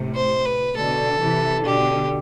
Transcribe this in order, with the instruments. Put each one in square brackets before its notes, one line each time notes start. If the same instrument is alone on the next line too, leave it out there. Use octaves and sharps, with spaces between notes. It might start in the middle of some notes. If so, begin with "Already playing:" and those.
Already playing: [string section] A2 C3
[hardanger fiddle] C5
B4
[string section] B2 D3 [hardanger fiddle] A4
[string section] C3 E3
[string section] B2 D3 [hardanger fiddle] G4